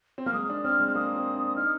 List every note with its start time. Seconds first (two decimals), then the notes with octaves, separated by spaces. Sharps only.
0.18 C4
0.26 A#3 F6
0.33 G#3 D#6
0.50 D4
0.64 C4 F6
0.80 G#3
0.88 F6
0.95 A#3 D#6
1.16 C4
1.36 D4
1.47 D#6
1.56 D#4 F6